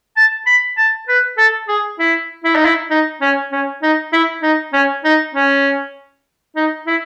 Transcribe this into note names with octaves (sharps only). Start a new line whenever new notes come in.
A5
B5
A5
B4
A4
G#4
E4
E4
D#4
E4
D#4
C#4
C#4
D#4
E4
D#4
C#4
D#4
C#4
D#4
E4